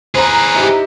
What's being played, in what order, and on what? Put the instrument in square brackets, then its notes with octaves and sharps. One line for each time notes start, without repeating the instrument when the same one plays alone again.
[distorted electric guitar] G#4 B4 [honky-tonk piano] C5 A#5
[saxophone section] D#4 E4 G4